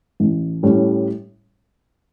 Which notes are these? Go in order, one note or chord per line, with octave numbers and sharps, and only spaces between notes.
A1
A2 G3 C#4